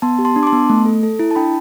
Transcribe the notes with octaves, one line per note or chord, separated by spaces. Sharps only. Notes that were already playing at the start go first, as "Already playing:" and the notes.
B3 A5 C6
G4
A5 C6
D4
D6
A5 C6
B3
A3
A4
A4
E4
A5
D4 G5 B5